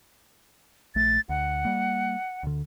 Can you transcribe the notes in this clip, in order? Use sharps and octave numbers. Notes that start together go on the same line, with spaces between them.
A#1 A3 A6
D2 F#5
G3 A#3
D2 D3